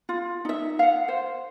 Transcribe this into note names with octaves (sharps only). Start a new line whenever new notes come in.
F4
D#4 E5
F5 F#5
C5